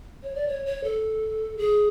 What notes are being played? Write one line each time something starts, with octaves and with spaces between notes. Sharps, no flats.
C#5
D5
C#5
C#5
A4
G#4